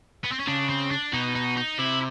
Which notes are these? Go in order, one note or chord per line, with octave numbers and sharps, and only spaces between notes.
B3
C4
C#4
C#3 D4
C4
D4
B2 D#4
D#4
D#4
C3 E4